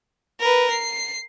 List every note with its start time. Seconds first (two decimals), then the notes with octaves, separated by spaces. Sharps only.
0.40 A#4 B4
0.71 C7